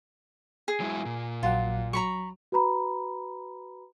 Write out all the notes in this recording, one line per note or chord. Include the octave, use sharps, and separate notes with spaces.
G#4
F#3 G#3 E4
A#2
A#1 F#3 F4 F#5
F#3 A#5 B5 C#6
F#4 B4 A#5 B5